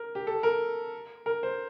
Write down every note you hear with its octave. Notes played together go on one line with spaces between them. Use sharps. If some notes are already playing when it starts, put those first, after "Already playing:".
Already playing: A#4
G4
A4
A#4
A#4
C5